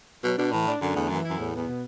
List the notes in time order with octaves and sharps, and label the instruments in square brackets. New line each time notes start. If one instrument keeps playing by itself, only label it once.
[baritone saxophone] B2 [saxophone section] F#3
[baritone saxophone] B2 [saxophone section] D4
[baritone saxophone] A2 [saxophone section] E3
[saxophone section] D4
[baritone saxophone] F#2 [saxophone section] D3
[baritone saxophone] E2 [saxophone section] A3
[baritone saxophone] F#2 [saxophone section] E3
[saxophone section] E4
[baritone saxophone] F#2
[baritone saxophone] E2 [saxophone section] A2
[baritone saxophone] E2 [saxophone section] B3
[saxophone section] B2